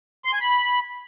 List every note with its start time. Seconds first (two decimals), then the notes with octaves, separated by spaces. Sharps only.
0.25 C6
0.33 G#5
0.41 B5